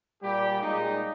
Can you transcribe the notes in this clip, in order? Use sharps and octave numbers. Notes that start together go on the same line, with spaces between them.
A#2 G3 G4
A#2 G#3 D#4